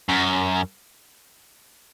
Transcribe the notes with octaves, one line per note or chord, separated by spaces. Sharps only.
F#2